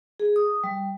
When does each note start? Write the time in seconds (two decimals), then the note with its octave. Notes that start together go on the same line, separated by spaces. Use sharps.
0.20 G#4
0.36 D#6
0.64 G3